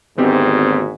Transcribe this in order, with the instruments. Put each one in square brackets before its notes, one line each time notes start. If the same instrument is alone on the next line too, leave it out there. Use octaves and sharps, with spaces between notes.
[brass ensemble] G#1 D2 G#2 [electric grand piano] B3 C4 G4